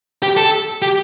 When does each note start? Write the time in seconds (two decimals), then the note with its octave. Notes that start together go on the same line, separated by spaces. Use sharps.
0.23 G4
0.37 A4
0.82 G4